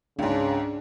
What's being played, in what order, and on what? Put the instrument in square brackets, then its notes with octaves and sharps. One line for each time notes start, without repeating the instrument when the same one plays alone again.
[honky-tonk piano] C#2 G#2 [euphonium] C#3 [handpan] D4